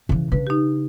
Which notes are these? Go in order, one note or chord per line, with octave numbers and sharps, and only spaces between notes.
C#3 E3
C#3 D4 B4
D#4 G4